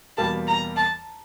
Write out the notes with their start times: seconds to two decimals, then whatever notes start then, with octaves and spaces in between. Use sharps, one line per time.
0.17 E2 B2 G3 A#3 A5
0.47 A#5
0.77 A5